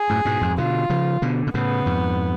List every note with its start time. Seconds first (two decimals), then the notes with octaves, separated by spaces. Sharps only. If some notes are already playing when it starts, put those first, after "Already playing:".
Already playing: G#4
0.10 F#2 A2
0.25 G#2 B2
0.41 F2 G#2
0.58 B2 D3 F4
0.90 C#3 F3
1.22 B2 D3
1.47 B2
1.54 A2 C#3 B3
1.86 F2 G#2